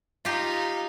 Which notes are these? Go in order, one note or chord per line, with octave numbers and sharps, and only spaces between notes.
D#4 F4 G4 F5